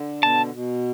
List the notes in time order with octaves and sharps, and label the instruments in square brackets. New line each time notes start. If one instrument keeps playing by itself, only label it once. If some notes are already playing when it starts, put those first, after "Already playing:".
Already playing: [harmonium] D3
[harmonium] B2 [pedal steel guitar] A5
[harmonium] B2